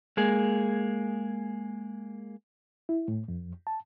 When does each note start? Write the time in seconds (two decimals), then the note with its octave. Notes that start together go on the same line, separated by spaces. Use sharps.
0.17 G#3 A#3 G#4
2.89 E4
3.08 A2
3.28 F2
3.67 A5